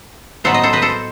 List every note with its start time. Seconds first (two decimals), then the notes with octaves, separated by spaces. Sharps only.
0.44 A2 F#3 B3 D#4 A4 C5
0.54 D#5
0.63 A4 C5
0.73 B4 D#5
0.82 A4 C5